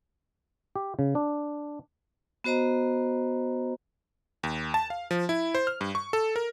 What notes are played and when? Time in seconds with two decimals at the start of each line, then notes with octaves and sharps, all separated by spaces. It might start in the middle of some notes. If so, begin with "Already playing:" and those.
0.76 G4
0.99 C#3
1.15 D4
2.44 B3 F#4 C5 D#5 A#5
4.43 D#2
4.74 A5
4.90 F5
5.11 F3
5.29 E4
5.55 C5
5.67 F6
5.81 G2
5.95 C#6
6.13 A4
6.36 A#4